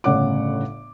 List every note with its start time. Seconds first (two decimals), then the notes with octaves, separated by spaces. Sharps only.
0.04 G1 A2 C#3 C#5 F#5 D6